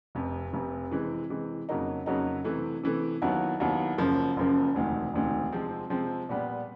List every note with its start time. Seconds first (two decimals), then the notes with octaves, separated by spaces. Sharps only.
0.15 F1 F2 C3
0.53 F1 F2 C3
0.91 C3 E3 G#3
1.30 C3 E3 G#3
1.69 F2 C#3 F#3 A#3 D#4
2.06 F2 C#3 F#3 A#3 D#4
2.44 C3 E3 A3
2.84 C3 E3 A3
3.22 D#2 D#3 F#3 B3 E4
3.60 D#2 D#3 F#3 B3 E4
3.98 F#1 F#2 C#3 F3 A#3
4.36 F#1 F#2 C#3 F3 A#3
4.75 E1 D2 C3 D#3
5.13 E1 D2 C3 D#3
5.52 C3 F3 G#3 C4
5.90 C3 F3 G#3 C4
6.29 A#2 G3 B3